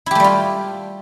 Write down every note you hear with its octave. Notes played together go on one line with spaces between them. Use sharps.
G3 A3 E4 F4 G4